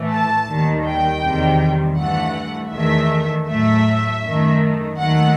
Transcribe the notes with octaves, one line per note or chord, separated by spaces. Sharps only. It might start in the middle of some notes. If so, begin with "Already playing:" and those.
Already playing: A2 E3 A3
A5
D#2 D#3 G3
G5
E2 C3 D#3 G3
G2 E3 A3 F#5
E2 D#3 A3 E5
A2 F#3 A3 E5
F#2 D#3 A3
D#2 D#3 F#3 A3 F#5